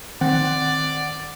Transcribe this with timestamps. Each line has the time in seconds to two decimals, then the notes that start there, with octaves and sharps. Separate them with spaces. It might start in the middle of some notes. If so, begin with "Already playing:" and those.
0.21 D#3 C4 D5 F#5